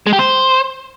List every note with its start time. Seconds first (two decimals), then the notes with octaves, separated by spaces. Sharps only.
0.07 G#3
0.13 G4
0.19 C5